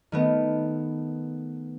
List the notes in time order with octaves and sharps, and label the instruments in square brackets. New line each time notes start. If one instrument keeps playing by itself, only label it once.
[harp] D#3 A3 B3